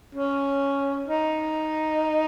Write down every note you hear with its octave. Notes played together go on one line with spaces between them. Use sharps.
C#4
D#4